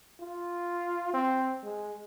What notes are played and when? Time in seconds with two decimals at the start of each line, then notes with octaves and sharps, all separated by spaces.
0.20 F4
1.14 C4
1.63 G#3